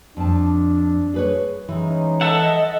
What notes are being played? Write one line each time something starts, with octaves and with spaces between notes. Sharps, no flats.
F2 D4 A5
G#4 B4 C#5
E3 G#3 C#4 D#4
A4 D#5 E5 F#5